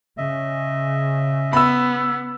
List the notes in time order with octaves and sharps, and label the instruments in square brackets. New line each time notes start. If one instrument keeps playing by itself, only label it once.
[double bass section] C#3 [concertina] D#5 E5
[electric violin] B3 [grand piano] B5 E6